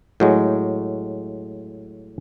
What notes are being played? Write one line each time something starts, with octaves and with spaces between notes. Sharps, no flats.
A2 F#3 G#3